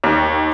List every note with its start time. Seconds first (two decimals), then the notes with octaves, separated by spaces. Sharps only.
0.04 D#2